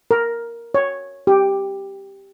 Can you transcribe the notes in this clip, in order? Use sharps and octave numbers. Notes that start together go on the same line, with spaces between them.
A#4
C#5
G4